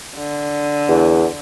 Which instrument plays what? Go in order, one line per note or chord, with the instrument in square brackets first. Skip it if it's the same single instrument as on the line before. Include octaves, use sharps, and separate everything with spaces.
[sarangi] D3
[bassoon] E2